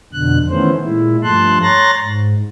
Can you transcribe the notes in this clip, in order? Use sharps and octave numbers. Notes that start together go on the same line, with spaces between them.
F2 B2 D3 F#6
D#3 E3 A3 B3 C#4 C5
A#2 G#3 E4
G2 F3 A3 A5 C6 F#6
C#5 A#5 C6 F#6 A6 A#6
G#2